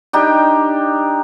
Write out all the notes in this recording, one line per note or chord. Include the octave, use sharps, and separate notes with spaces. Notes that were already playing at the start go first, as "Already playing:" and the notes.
D4 D#4 G4